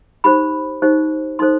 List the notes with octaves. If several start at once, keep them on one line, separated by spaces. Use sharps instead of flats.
D#4 G4 C5 B5
D#4 G4 C5
D#4 A4 C5 C6